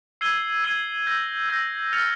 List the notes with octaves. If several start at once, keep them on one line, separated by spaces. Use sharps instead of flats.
E6 G#6 C7 D#7 G7
E6 G#6 C7 D#7 G7
E6 G6 A#6
E6 G6 A#6
F6 A6 C#7 F7